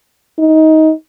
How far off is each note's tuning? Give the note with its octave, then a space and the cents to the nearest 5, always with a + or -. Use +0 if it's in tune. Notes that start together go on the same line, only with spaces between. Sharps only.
D#4 +20